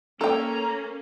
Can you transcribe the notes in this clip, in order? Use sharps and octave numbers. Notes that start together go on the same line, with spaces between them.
A#3 C#4 A4 G5 A#5